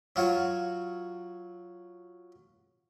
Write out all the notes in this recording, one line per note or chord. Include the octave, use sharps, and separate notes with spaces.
F#3 F4 F#4 C#5